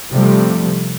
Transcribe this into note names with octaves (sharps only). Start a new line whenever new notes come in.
C3 F3 G3 A3